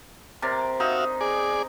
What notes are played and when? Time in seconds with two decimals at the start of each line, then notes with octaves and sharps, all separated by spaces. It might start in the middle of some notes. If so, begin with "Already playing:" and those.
0.42 C3 A#4 D5
0.80 D#4 F#4 E5 F5
1.21 G#4 D5